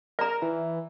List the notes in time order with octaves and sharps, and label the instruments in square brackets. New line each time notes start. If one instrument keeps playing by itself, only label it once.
[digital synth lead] A#4 [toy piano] D5 A#5
[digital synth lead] E3